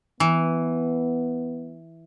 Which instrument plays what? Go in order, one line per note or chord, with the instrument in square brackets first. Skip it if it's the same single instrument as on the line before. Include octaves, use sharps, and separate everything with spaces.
[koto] E3 [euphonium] B3